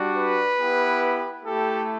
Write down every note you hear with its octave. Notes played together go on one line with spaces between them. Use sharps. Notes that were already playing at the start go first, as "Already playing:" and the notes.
Already playing: G3 D4 F#4
B4
B3 E4 G4
A3 E4 G4 A4